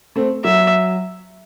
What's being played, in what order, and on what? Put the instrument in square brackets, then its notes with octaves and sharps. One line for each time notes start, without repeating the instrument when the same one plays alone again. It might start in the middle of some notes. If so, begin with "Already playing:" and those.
[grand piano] A3 C4
[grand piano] F#3 [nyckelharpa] E5